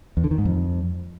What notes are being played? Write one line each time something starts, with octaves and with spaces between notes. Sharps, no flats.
E2
D3
D#3
G#2
F2